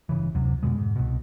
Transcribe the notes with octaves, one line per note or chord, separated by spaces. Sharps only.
G1 C#3 E3
F#1 D2 C3 F#3
F2 B2 D3 G#3
G#2
C2 B2